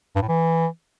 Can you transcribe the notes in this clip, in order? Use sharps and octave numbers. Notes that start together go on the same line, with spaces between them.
G2
A2
E3